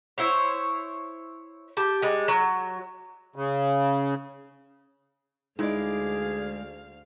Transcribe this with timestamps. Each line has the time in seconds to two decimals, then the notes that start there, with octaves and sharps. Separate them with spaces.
0.18 E4 C5 C#5
1.77 G4 A5
2.02 G3 G#3
2.28 F#3
3.36 C#3
5.59 D2 G#3 D#4 E4 G#4 D5 F5